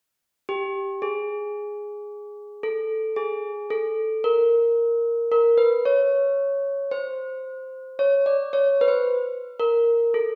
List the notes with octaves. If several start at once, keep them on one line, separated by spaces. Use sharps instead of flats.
G4
G#4
A4
G#4
A4
A#4
A#4
B4
C#5
C5
C#5
D5
C#5
B4
C5
A#4
A4